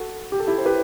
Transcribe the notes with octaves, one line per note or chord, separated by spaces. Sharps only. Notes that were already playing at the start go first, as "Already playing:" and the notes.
Already playing: F#4 A4
G4
A4
E4 G4
C5
G4 B4